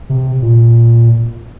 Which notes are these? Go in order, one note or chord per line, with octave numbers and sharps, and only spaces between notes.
C3
A#2